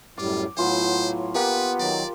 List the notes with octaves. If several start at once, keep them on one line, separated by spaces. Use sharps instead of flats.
F#2 A2 G3 F4 D6
A2 F#3 B3 F4 C5 G#5
A#3 B3 G4 B4
D#3 F#3 D5